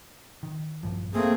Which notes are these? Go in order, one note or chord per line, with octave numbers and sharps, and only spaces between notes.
D#3
A#1 G2 F3
A3 A#3 C4 G#4